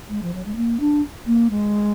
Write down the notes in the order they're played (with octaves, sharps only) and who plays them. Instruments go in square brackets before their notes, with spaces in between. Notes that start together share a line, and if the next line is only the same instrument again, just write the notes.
[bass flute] G#3
F3
F#3
G#3
A#3
D4
A#3
G#3